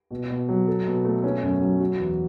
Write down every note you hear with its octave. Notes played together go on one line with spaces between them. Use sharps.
B2
B2
F#3
A4
B2
A3
C#4
F#2
F#3
F#4
E2